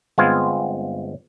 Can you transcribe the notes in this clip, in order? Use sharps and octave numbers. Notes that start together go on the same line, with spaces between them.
G1 G#3 B3 C4 F4 G#5